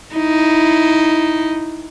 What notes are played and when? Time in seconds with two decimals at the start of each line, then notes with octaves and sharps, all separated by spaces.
0.15 D#4 E4